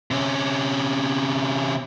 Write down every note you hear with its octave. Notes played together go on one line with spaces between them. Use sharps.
C3 C#4